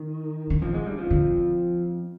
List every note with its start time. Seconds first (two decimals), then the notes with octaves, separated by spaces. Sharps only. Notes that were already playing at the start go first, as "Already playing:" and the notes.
Already playing: D#3
0.50 D3
0.62 F2 D#3 F3
0.74 G#2 G#3
0.86 G2 G3
0.98 F2 F3
1.11 D3